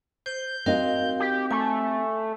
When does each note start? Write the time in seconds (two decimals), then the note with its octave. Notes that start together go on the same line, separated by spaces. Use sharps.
0.26 C5 G6
0.66 C4 D#4 F#4 A#4 D#5 F5
1.20 G4
1.51 A3 G#5